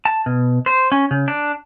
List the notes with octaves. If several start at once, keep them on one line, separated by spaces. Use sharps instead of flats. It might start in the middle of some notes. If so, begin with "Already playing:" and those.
A5
B2
C5
C#4
C#3
D4